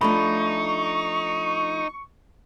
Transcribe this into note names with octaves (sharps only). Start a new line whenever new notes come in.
F3 A3 D4 D#4 B5 C#6